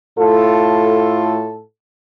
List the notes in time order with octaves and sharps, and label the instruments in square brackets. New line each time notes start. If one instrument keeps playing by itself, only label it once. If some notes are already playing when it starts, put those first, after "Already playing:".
[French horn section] A2 F4 A4